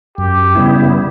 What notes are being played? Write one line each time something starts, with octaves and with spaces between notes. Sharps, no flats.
F#2 G4
C#3 G3 B3 E4